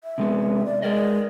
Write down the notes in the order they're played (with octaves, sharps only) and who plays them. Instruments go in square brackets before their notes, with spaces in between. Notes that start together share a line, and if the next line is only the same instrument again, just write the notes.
[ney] E5
[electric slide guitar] C3 G#3 B3
[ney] D5
[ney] G#3 [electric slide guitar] A#4 D5 D#5